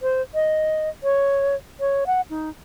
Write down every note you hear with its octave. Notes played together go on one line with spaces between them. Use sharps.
C5
D#5
C#5
C#5
F#5
D#4